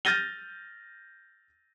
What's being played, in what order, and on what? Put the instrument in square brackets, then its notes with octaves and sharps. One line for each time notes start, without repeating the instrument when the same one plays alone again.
[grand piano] F6 G6 A6 A#6 D#7 G7